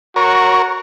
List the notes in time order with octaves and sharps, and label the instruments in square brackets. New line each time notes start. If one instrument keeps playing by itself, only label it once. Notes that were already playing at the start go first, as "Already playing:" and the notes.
[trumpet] F#4 [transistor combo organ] A#4 C#5